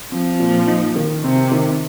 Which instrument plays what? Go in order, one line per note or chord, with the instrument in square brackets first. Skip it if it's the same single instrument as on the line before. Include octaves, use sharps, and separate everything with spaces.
[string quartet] F3 [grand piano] C4
[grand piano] A#2
D#4
D#3
[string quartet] C3 [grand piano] C4
[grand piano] D#3